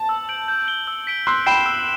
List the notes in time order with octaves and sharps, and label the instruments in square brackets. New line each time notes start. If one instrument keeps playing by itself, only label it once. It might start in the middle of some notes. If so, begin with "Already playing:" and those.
Already playing: [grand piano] A5
[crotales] E6
G6 D7 F#7
G6
D7 G7
E6
B6 D7 G7
[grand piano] C6 E6 [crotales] F#6
[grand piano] G5 B5 [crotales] C7 E7 G7
[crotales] E6